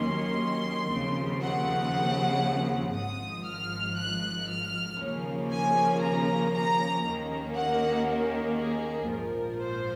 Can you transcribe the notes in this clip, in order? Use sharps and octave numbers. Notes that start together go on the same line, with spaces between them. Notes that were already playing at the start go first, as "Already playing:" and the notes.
Already playing: D#2 D#3 F#3 A#3 C#4 C6
D#2 C#3 F3 C4
F#5
G#1 G#2 F3 D#6
F6
F#6
F6
D#2 C#3 F3 A#3 C#4
G#5
A#5
A#5
D#2 D#3 A#3 C#4
F#5
A#4
G#4
A#1 G#2 F3 A#4
C5